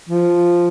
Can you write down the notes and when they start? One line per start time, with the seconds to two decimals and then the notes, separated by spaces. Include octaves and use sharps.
0.09 F3